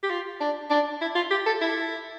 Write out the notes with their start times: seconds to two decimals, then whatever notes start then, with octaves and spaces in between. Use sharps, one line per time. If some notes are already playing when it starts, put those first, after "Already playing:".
0.03 G4
0.10 F4
0.40 D4
0.70 D4
1.01 E4
1.15 F4
1.31 G4
1.46 A4
1.61 E4